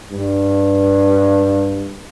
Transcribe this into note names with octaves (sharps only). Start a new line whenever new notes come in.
G2